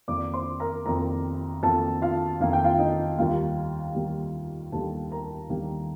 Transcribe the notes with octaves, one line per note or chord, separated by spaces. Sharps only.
F2 D#3 A#3 D5 D6
C5 C6
A#4 A#5
F2 D#3 A#3 A#4 A#5
F2 D#3 A#3 A4 A5
F4 F5
F2 D#3 A#3 F5
G5
F4 F5
D#4 D#5
D#2 D#3 G3 A#3 F4 F5
D#2 D#3 G3 A#3
D#2 D#3 G3 A#3 A4 A5
A#4 A#5
D#2 D#3 G3 A#3